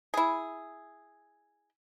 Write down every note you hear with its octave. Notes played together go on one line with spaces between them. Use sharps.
E4 G#4